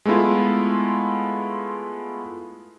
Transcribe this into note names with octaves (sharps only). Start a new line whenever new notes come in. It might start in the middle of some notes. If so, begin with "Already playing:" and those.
G#3 A3 B3 E4 F4